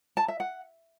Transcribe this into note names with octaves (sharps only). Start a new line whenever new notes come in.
A5
E5
F#5